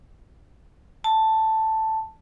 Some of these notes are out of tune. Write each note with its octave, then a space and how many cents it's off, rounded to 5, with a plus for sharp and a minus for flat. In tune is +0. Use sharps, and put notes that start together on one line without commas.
A5 +5